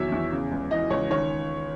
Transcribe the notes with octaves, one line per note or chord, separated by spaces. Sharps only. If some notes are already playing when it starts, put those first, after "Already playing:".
Already playing: E2 D#3 F#3 C#5 E5
E2
C#3
C#2
E3 D#5
C#2 C#5
D#3 C#5